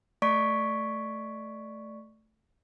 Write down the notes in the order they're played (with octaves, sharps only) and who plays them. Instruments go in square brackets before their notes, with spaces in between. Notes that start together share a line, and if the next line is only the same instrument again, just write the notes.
[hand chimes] A3 D5 C#6 B6 D7